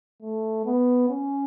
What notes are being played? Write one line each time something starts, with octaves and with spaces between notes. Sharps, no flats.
A3
B3
C#4